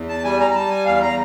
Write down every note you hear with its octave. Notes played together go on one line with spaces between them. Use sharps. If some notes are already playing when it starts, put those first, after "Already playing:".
Already playing: E2
A5
G3 G#5
A#5
A#5
G3 A5
G#5
E2 F5
A#5